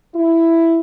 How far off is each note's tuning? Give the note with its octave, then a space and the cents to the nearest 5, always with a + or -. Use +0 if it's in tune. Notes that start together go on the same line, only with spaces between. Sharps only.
E4 +5